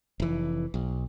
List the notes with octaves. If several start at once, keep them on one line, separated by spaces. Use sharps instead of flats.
F1 E3
B1